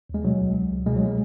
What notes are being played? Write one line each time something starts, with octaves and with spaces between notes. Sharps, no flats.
D#2 G#3
B2 F#3
C#2
F#3
C#2
B2 G#3
F#3
G#3